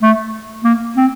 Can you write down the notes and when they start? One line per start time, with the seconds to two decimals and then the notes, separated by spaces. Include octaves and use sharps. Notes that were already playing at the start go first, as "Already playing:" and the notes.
0.02 A3
0.64 A#3
0.96 C4